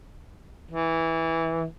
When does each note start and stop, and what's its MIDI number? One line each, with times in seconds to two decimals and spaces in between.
0.71 1.66 52